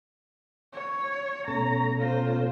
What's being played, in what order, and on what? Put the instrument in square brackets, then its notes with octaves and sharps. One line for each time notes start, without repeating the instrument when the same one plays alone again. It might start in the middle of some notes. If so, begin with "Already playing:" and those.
[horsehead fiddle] C#5
[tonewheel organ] B2 A3 C#4 [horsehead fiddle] A#5
[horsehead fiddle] F4 C5